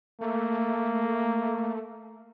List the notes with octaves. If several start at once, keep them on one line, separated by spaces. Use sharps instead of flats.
A3 A#3